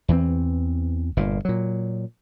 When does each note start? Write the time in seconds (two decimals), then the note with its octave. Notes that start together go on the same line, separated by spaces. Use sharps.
0.08 E2 E3 C4
1.17 G1 A#2
1.45 A#2 F#3